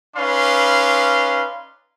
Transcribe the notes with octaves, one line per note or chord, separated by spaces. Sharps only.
C#4 D#4 B4 D5 F5 C6